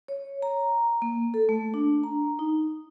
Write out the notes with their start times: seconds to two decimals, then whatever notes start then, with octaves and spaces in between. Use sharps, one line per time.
0.08 C#5
0.42 A#5
1.02 A#3
1.34 A4
1.49 A3
1.74 D4
2.04 A#5
2.39 D#4